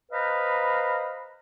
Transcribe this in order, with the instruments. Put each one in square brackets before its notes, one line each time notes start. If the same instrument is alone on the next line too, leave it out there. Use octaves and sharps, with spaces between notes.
[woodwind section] B4 C5 D#5 F5 A#5 B5